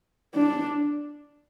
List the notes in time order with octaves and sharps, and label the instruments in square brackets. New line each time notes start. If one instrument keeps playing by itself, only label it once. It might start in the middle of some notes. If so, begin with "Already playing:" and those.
[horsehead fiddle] D4